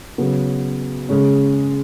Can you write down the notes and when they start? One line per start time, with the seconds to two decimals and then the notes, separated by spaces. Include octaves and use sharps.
0.18 C#3 F#3 B3
1.09 C#3 G#3 C#4